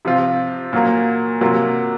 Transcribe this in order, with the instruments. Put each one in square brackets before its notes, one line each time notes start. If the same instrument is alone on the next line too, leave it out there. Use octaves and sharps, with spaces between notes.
[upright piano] C3 F3 C4 F4
A#2 F#3 A#3
C3 F#3 A#3 F4